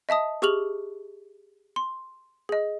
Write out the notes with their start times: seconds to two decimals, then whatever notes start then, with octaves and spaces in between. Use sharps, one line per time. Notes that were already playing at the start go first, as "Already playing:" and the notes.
0.09 D#5 E5 A5 D#6
0.42 G4 G#4 C#6 F6 F7 F#7
1.76 C6
2.49 G#4 D#5